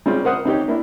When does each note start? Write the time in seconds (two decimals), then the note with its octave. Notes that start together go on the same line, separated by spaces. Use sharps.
0.06 G3 G#3 C4 C#4 F4
0.24 A#4 C5 F#5 D#6
0.45 C4 D#4 G4 C#5
0.68 A#3 D4 E4